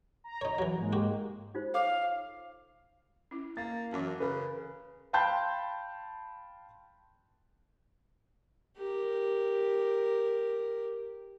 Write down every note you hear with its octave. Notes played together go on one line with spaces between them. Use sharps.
A#5
D#4 C#5
E3 F#3
G#2 G#3 A#3
F#4 G4
D#4 F4 C5
A4 C#5 F5 D6
C#4 E4
A#3 A6
F#2 E3 C#4 A5
C#3 A#4 B4
F5 G5 A5 B5 C6 G6
G4 A#4